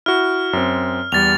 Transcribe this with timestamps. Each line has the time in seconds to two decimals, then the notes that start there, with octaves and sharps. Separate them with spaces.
0.06 E4 F#4 F6
0.53 F#2 C4
1.12 E2 G3 A6 F7